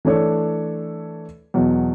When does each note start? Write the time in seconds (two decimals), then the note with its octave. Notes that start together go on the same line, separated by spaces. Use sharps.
0.05 E3 A3 D4 A4 C#5
1.54 E2 B2 F#3